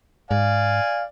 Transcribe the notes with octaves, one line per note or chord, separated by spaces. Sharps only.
G#2 D5 F5 G#5